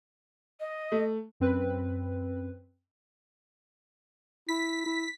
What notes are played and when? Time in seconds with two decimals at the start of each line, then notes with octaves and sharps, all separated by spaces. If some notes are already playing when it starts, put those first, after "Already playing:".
0.60 D#5
0.92 A3
1.40 F#2 C4 B4
4.49 E4 B6
4.86 E4